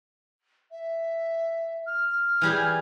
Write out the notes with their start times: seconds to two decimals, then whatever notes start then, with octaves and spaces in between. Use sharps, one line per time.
0.71 E5
1.86 F6
2.41 E3 G3 G#4